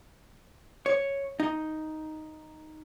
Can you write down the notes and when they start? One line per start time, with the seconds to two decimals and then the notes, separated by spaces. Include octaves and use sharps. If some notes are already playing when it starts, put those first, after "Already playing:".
0.86 C#5
1.40 D#4